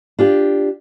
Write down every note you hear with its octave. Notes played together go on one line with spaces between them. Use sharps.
D4 F4 G4